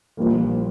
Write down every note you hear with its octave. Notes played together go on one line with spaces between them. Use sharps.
A#1 A#2 G3 A#3